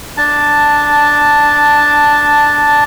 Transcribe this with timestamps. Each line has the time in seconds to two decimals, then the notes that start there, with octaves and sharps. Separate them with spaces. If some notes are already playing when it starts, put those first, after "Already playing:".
0.17 D4 A5